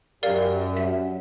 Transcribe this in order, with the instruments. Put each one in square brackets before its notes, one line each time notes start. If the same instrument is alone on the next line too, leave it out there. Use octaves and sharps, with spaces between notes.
[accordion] F#2 [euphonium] G4 [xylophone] A#4 D5 F5
[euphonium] F#3 [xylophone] E5